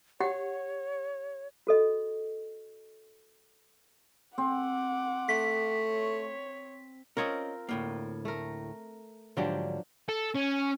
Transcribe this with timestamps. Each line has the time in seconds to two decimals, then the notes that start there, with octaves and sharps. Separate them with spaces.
0.20 G4 C#5 F#5 G5
1.67 F#4 A4 D#5
4.38 C4 F#5 D6
5.29 A3 B6
5.87 C#5
7.17 C4 C#4 F4 A#4 C#5 D#5
7.69 D2 A2 A#3
8.25 A3 A#4
9.37 G#2 D3 F3 F#3 D4 G4
10.09 A4
10.35 C#4